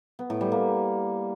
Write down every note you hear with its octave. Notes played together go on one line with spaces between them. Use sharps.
B3
A2
G3
A#3